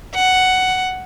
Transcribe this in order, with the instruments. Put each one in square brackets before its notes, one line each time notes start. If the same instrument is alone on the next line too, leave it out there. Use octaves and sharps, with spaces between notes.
[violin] F#5